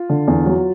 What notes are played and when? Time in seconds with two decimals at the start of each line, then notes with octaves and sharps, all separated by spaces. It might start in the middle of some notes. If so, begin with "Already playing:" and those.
Already playing: F4
0.09 D3
0.27 E2
0.46 F#3